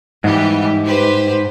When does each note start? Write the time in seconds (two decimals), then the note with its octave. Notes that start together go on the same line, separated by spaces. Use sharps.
0.24 G#2 E3 G3 G4
0.86 G4 B4 C5